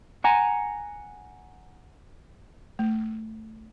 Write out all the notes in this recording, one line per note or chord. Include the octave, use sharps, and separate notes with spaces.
F#5 G#5 A#5
A3